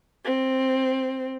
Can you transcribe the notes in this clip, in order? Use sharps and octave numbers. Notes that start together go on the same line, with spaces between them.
C4